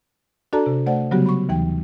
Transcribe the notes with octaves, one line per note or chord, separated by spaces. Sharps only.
D4 F#4 A4 D5 A5 A#5
C3
A3 C5 D5 F#5
C#3 F#3 G3 B3 F#4 G4
B5 C#6
D#2 E3 G5